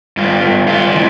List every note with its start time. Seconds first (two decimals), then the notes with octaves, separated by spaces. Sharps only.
0.17 G2 F4
0.43 G2
0.67 G2 F4
0.93 E3